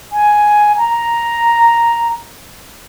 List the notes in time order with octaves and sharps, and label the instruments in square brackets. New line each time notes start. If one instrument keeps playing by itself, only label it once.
[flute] G#5
A#5